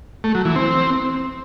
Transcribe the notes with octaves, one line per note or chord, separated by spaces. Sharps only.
A3
F#3
E3
C4